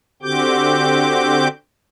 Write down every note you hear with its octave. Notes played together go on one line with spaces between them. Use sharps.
D3 C4 F#4 G4 D6 G6